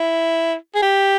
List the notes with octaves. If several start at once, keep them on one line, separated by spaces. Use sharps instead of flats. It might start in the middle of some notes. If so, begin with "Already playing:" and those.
Already playing: E4
G#4
G4